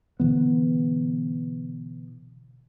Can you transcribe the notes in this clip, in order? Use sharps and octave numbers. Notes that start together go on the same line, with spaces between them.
B2 D3 E3 B3